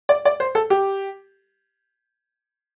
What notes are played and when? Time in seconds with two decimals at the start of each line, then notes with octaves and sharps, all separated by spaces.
0.09 D5
0.25 D5
0.40 C5
0.55 A4
0.70 G4